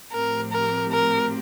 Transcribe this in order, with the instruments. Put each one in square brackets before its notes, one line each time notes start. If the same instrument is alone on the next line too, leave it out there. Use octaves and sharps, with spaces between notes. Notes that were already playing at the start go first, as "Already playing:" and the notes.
[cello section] A2 F3 C4 G4 [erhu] A#4
[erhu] A#4
A#4